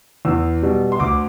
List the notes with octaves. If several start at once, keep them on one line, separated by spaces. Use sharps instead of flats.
E2 E6
B2 G3
C6
D2 D6